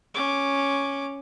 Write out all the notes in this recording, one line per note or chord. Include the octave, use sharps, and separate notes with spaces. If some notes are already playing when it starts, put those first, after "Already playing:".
C#4 D6